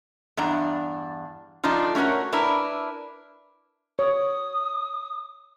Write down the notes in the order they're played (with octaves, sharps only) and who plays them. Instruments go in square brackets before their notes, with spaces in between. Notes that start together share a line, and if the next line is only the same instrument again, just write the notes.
[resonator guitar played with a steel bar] E2 G2 D4 A#5
F3 A3 D4 D#4 F4
A3 C#4 F#4 A#4 C#5
D4 E4 A#4 B4
[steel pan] C#5 [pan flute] D#6